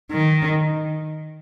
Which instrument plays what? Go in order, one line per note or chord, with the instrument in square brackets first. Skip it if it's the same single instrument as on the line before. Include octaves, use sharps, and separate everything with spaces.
[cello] D#3